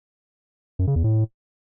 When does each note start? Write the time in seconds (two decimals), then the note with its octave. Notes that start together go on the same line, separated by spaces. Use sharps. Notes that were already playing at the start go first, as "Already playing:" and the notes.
0.79 F#2
0.87 C#3
0.96 E2
1.04 A2